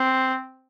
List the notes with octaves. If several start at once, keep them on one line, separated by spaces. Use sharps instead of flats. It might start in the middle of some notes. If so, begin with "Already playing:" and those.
Already playing: C4